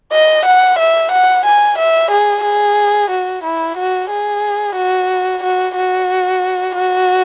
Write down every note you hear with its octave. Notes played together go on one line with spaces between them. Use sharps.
D#5
F#5
E5
F#5
G#5
E5
G#4
G#4
F#4
E4
F#4
G#4
F#4
F#4
F#4
F#4